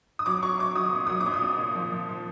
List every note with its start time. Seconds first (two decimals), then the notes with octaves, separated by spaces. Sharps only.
0.19 D#6
0.26 F#3 D6
0.43 F#3 C#6
0.59 F#3 D6
0.76 F#3 D#6
0.93 A#2
1.07 F#3 D#6
1.21 D6
1.26 A#2
1.34 D#6
1.42 A#2
1.58 A#2
1.75 F3
1.92 F3
2.09 F3